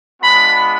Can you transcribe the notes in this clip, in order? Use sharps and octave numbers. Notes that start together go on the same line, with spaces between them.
G#3 B3 D4 F4 B5